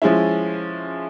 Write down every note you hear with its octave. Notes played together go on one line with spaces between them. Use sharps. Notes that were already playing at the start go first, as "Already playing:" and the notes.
F3 G#3 C#4 E4